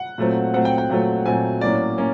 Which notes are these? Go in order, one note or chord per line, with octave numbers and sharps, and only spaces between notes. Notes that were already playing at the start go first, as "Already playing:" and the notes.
Already playing: F#5
A#2 F#3 A3 C4
A#2 F#3 A3 C4 F#5
G5
G5
A#2 F#3 A3 C4
A#2 F#3 A3 C4 G#5
A2 F#3 A#3 C#4 D5
A#3 C#4